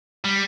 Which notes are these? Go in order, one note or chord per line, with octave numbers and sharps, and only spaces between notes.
G3